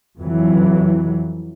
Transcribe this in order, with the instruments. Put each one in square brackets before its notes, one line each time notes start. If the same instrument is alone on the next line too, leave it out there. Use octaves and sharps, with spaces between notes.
[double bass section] F2 E3 F#3